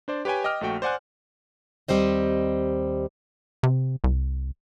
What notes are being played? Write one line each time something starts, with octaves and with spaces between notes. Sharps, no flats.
D4 C5 D5
G4 B4 C#5 G5 G#5
D#5 G5 D6 F6
A#1 A3 F#4 G5
C5 D5 F#5 G#5 F#6
D#2 D#3 G3 C4 C5 D#5
C3
C2